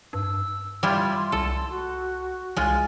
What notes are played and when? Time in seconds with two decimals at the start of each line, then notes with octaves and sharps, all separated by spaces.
0.13 G2 E6
0.83 G3 E4 F4 C6
1.32 C2 A4
1.70 F#4
2.56 C2 G#3 F4